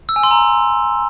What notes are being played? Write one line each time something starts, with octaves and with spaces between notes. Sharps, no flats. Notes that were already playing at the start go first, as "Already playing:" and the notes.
E6
G#5
C6
A#5